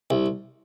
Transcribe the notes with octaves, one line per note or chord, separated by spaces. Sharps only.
C2